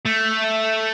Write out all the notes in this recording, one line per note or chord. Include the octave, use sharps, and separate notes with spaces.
A3